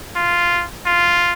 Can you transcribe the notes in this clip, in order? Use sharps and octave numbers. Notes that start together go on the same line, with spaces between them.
F4
F4